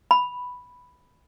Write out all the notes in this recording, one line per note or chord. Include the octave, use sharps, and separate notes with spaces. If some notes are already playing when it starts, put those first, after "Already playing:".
B5